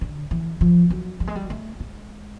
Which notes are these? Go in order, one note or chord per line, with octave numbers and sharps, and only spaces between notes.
D3
E3
F3
F#3
G3
G#3
G3
A3
G#3